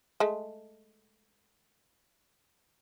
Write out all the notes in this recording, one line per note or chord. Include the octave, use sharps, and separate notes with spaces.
G#3 A3